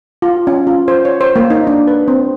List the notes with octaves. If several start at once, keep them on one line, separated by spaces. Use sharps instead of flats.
F4
C#4
F4
C5
C#5
C5
A#3
D#4
D4
B4
C4